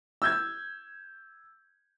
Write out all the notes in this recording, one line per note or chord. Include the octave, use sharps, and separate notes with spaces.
E6 G6 G#6